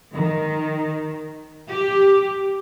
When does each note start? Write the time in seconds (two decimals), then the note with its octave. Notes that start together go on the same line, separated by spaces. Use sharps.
0.15 D#3
1.69 G4